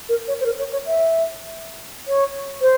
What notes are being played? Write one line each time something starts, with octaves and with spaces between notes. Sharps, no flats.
A#4
C#5
C5
A#4
C#5
C#5
E5
C#5
C5